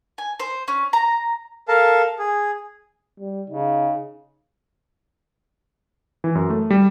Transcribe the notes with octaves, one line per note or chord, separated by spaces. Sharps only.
G#5
C5
C#4
A#5
A4 A#4 F5 A5
G#4
G3
C#3 D#4
E3
F#2
A3
G3